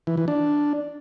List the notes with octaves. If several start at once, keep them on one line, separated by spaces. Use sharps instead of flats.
E3
E3
D4